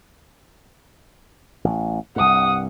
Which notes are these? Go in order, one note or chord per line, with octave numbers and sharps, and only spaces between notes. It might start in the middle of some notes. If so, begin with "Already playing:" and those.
A1
C2 G2 F#5 D#6